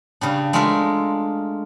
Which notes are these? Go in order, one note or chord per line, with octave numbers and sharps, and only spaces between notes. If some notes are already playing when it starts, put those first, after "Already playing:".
C#3 G3 D4
G#3 A3 D4 F4 A#4 E5